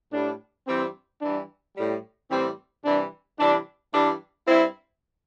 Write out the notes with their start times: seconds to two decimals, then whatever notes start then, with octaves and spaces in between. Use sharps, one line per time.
0.12 A2 G3 D4
0.67 G2 E3 G3 C4
1.21 G2 E3 G3 D4
1.76 A2 G3
2.30 A2 E3 G3 C4
2.84 C3 E3 G3 D4
3.39 C3 E3 G3 D4
3.93 G2 E3 G3 D4
4.47 G2 G3 C4 E4